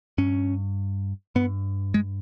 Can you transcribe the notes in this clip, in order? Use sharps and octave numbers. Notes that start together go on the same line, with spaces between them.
G2 C#4
G2 B3
G#3